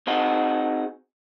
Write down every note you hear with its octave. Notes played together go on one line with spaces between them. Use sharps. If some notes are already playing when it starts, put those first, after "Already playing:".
C4 D#4 F#4 G#4 D#5